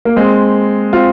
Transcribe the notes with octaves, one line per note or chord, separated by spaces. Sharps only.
A#3
G#3 C4
C4 F4